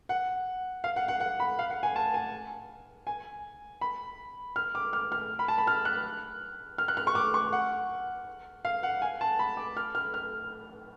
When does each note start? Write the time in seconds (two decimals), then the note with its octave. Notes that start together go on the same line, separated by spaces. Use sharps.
0.09 F#5
0.84 F5
0.96 F#5
1.08 F#5
1.20 F#5
1.40 B5
1.59 F5
1.70 F#5
1.83 G#5
1.96 A5
2.14 G#5
3.07 G#5
3.81 B5
4.56 F6
4.75 D6
4.93 F6
5.12 F6
5.39 B5
5.48 A5
5.58 B5
5.67 F6
5.85 F#6
6.78 F6
6.88 F#6
6.97 F6
7.07 C#6
7.15 D6
7.34 C#6
7.53 F#5
8.65 F5
8.83 F#5
9.02 G#5
9.21 A5
9.39 B5
9.57 D6
9.77 F6
9.95 F6
10.14 F6